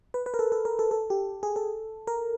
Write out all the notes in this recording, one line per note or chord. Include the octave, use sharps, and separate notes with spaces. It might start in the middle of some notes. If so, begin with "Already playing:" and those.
B4
B4
A#4
A4
A4
A#4
A4
A4
G4
G#4
A4
A#4